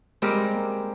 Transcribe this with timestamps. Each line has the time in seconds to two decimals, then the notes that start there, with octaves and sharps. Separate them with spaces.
0.22 G3 G#3 C4 G4 A#4
0.53 A#3